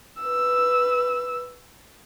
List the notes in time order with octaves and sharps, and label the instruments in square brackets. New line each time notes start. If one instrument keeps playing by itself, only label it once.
[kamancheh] B4 E6